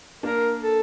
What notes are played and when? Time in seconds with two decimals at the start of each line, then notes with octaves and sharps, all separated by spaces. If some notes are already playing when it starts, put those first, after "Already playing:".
0.23 A#3 D4 A#4
0.62 A4